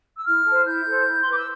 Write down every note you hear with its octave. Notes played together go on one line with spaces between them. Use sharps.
E6
E4 F6
A4 C5
E4 G6
A4 C5
E4
C6
B4 D6
E6